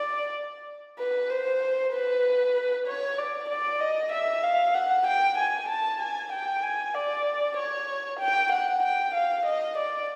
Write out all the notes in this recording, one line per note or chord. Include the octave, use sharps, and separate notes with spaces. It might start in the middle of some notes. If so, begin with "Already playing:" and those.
Already playing: D5
B4
C5
B4
C#5
D5
D5
D#5
E5
F5
F#5
G5
G#5
A5
G#5
G5
G#5
D5
C#5
G5
F#5
G5
F5
D#5
D5